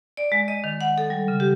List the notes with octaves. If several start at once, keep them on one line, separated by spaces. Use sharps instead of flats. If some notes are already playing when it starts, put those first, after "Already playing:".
D5
G#3
D#5
D#3
F#5
A4
G3
C#3
G4